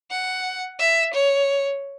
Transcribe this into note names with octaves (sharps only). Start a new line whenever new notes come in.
F#5
E5
C#5